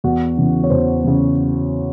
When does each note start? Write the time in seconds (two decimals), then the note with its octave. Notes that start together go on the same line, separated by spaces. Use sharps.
0.04 E2 F#4
0.37 C#3 E3
0.64 C#5
0.70 E2 C5
1.04 C#3 E3